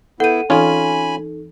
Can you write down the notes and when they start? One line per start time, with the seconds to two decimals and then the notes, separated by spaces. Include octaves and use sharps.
0.20 B3 E4 A4 F#5 G6 D#7
0.50 E3 C4 C#4 D#4 F4 A4 G#5 B5